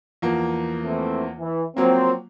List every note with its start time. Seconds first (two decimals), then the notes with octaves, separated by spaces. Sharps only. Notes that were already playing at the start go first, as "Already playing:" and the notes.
0.22 E2 F3 A#3
0.84 E3 A3 C4
1.38 E3
1.77 F3 F#3 A#3 C4